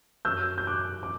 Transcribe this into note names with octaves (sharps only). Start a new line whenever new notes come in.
F#2 F#3 E6 G6
G6
D6 F#6
D6